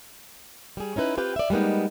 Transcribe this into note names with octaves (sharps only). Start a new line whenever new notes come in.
G3 G#4
C#4 D#4 E4 B4
C4 F4 G4 B4 G5
D5 E5
G3 G#3 A#3 B3 D#4